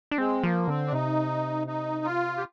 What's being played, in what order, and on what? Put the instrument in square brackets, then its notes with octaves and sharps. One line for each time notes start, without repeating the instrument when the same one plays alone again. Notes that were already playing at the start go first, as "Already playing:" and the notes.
[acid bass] D4
[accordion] G#3 [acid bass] C4
[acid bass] F3 [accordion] A#3
[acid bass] D3 [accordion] C4
[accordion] D4
[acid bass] C3 [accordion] D#4
[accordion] D#4
F4
G4